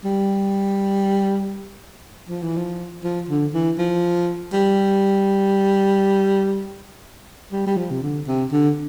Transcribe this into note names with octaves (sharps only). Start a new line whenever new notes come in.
G3
F3
E3
F3
F3
D3
E3
F3
G3
G3
G3
F3
C3
D3
C3
D3